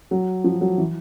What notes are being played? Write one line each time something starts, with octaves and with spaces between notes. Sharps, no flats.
F#3
F3
F#3
E3